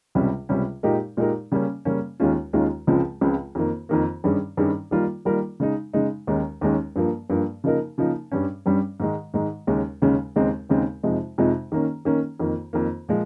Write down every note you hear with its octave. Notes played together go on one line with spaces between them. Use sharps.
C#2 C3 G3 C#4
C#2 C3 G3 C#4
A#2 G#3 D#4 G4 A#4
A#2 G#3 D#4 G4 A#4
C#3 G3 A#3 C#4
C#3 G3 A#3 C#4
D#2 D#3 G#3 C#4 F4
D#2 D#3 G#3 C#4 F4
C#2 C#3 F3 G#3 C4
C#2 C#3 F3 G#3 C4
F2 D#3 A#3
F2 D#3 A#3
G2 D#3 G3 C#4 G#4
G2 D#3 G3 C#4 G#4
D#3 G3 A#3 F4 A#4
D#3 G3 A#3 F4 A#4
C#3 G#3 D#4
C#3 G#3 D#4
D#2 D#3 G#3 C#4
D#2 D#3 G#3 C#4
G2 F3 A#3
G2 F3 A#3
C#3 F3 A#3 D#4 A#4
C#3 F3 A#3 D#4 A#4
G2 G3 C#4
G2 G3 C#4
G#2 D#3 G#3
G#2 D#3 G#3
D#2 C#3 G#3 C#4
D#2 C#3 G#3 C#4
D#2 C#3 G#3 C4 D#4
D#2 C#3 G#3 C4 D#4
F2 C3 F3 G#3 D#4
F2 C3 F3 G#3 D#4
D#3 A#3 C#4
D#3 A#3 C#4
F2 D#3 A#3
F2 D#3 A#3
A#2 F3 G#3